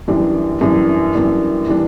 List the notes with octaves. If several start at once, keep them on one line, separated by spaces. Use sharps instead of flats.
F#2 E3 G3 D4
F#2 E3 G3 D4
F#2 E3 G3 D4
E3 G3 D4